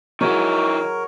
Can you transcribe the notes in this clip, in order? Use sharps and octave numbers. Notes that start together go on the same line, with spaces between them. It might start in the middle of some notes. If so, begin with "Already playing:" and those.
D#3 F#3 G#3 E4 A#4 C#5